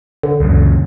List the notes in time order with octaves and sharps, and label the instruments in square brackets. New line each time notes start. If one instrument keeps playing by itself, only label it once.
[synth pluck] D3
[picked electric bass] C#2 F#2